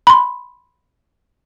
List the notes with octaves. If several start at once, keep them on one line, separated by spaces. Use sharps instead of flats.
B5 C6